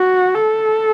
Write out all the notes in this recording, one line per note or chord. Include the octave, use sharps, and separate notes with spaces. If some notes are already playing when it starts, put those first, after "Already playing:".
Already playing: F#4
A4